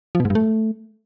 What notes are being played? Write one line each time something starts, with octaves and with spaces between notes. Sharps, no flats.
F3
B2
G#2
G2
A3